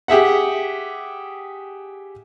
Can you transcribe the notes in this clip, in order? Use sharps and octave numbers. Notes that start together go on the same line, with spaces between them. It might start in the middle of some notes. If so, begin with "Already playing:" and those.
G4 G#4 E5 F#5